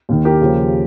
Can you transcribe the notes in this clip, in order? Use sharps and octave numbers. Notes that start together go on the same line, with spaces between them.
D#2 D#3
G4 A#4
D#2 C#3 F3